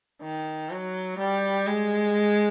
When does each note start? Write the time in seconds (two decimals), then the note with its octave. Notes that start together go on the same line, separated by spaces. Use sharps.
0.22 D#3
0.70 F#3
1.18 G3
1.66 G#3